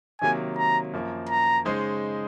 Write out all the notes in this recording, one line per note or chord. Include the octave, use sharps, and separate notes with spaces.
C3 D#3 F#3 A#3 G#5
A#5
F#2 F3 A#3
A#5
C#3 G#3 D#4 G#4 C5